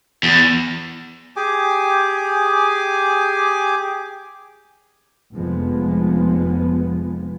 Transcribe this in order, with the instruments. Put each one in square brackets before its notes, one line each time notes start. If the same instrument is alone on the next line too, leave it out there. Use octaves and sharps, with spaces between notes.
[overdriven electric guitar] E2
[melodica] G4 G#4 G#5 D6
[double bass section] F1 F2 F3 G#3 B3